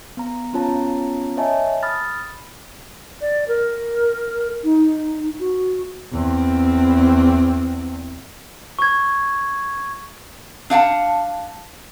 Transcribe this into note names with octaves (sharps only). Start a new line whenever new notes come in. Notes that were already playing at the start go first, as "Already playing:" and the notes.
B3 A#5
B3 C#4 F4 C#5 A5 A#5
C#5 D#5 E5 G#5 A5
B5 D#6 F6 A6
D5
A#4
D#4
F#4
E2 C4
C#6 G#6
D4 F5 F#5 A5